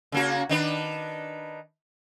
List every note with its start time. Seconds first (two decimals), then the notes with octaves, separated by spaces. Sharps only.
0.12 C#3 A#3 F#4
0.49 D#3 D4 B4